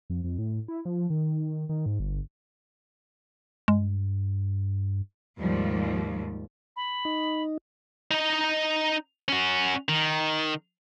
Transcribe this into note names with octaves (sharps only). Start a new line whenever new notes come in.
F2
F2
A2
E4
F3
D#3
D#3
G#2
G1
G2 G#3
D#2 G#2 F3 G3
B5
D#4
D#4 D#5
C#4 F#4
D#3